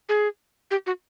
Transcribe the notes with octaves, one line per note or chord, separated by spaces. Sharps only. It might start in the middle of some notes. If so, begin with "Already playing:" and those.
G#4
G4
F#4